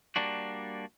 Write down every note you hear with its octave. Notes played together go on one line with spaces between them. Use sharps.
G3 A#3 D4 F#4